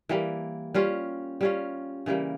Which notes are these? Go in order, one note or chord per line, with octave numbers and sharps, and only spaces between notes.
E3 G3 A#3
G3 C#4 F4
G3 C#4 F4
C#3 E3 G3 A#3